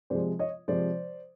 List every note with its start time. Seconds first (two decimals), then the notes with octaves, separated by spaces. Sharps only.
0.10 C3 F3 G#3 C5 D5
0.39 C#5 D#5
0.68 C3 F3 G#3 C5 D5